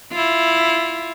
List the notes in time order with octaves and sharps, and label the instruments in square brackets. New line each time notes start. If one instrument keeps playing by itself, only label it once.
[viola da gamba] E4 F4